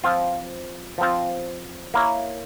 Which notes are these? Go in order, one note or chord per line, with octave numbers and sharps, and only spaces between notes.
F3 C4 F4
F3 C4 F4
A#3 E4 A#4 C#5